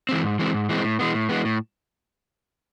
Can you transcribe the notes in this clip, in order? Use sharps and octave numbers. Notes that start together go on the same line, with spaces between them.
E3 G#3 C4
G#2
E3 G#3 C4
G#2
E3 G#3 C4
A2
E3 G#3 B3
A2
E3 G#3 B3
A2